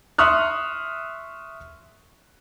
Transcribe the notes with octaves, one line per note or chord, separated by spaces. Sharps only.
E5 C6 C#6 D#6 F6 F#6